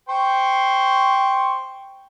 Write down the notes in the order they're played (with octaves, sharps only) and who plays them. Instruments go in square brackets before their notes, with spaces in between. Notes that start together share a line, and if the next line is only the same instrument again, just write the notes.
[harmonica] C5 G5 C#6